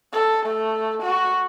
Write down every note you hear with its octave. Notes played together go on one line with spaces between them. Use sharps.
A4
A3
F#4